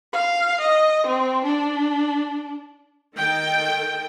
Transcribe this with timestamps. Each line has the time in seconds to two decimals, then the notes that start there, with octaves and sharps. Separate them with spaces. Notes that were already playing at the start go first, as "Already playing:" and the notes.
0.13 F5
0.61 D#5
1.07 C4
1.45 D4
3.16 D#3 A4 G5